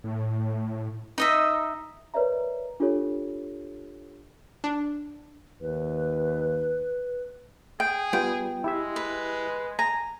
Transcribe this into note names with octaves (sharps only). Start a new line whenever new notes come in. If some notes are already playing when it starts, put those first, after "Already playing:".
A2
D#4 D#5 E5
A#4 B4 C#5 D5 E5 A#5
D4 F4 G4 A4 C#5
D4
D#2 B4
G#4 G5
G3 B3 F4 G5
G#3 E4 G4 E5
B4
G#5 A#5